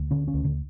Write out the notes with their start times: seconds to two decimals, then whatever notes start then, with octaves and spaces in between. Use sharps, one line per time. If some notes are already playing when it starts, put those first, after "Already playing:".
Already playing: D2
0.11 D3 C#4
0.28 C#4
0.34 D2
0.44 D3